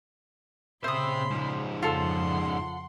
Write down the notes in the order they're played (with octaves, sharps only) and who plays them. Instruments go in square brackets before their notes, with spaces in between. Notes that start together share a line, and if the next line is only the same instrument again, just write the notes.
[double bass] A#2 C#3 [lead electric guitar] C4 E5 [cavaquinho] C5 D#6 [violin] B5 C6
[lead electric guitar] G#2 F3
[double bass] F2 C#3 [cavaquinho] F4 A4 [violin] F#5 C6